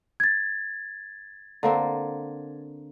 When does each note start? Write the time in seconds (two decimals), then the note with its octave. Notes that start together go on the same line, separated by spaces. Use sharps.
0.20 G#6 A6
1.63 D3 A#3 C4